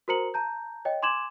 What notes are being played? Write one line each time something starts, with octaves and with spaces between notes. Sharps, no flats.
F#4 A#4 C5 A#5 C#7 F#7
A5 A#5 G6
C#5 D#5 G5
G#5 C6 D6 G#6 E7 F#7